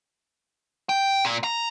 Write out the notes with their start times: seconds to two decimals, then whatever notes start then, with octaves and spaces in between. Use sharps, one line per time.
0.89 G5
1.25 A#2
1.44 A#5